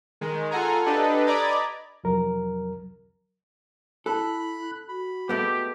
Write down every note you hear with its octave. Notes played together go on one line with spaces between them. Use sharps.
D#3 G#3
F4 A4 F#5 G#5 A#5
D4 G4 A4 B4 D#5
D5 D#5 A#5 B5 D6 G#6
C2 F2 F#3 A#4
E4 A4 B5 F#6
F#4 B5
G#3 A3 B3 G4